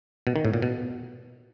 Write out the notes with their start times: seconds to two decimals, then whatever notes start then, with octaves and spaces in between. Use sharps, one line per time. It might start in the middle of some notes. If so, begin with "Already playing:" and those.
0.27 B2
0.36 D#3
0.45 A2
0.53 A#2
0.62 B2